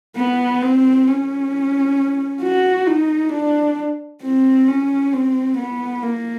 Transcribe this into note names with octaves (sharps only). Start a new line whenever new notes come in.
B3
C4
C#4
F#4
D#4
D4
C4
C#4
C4
B3
A#3